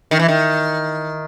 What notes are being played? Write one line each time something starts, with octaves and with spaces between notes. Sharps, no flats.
D#3
E3
D#3